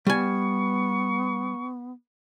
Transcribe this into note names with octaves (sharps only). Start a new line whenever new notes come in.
G3 B3 G#5 C#6